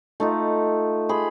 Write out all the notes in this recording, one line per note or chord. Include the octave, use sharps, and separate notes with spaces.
A3 D#4 F4
G#4 B5 C6